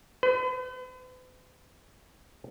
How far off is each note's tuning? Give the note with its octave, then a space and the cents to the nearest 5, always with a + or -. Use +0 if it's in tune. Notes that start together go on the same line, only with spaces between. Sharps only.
B4 +45